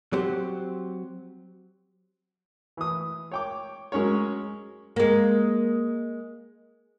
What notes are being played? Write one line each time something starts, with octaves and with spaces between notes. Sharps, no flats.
F#3 C4 G4 C5
E3 D#6
C#5 G5 D6
F#3 G#3 C#4 A#4 C#5
G#3 A#3